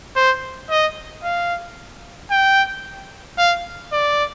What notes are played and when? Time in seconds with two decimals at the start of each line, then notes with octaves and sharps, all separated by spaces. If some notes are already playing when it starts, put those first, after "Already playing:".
0.16 C5
0.70 D#5
1.24 F5
2.31 G5
3.38 F5
3.93 D5